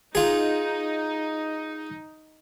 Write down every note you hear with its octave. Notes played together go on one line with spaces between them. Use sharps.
D#4 F4 G#4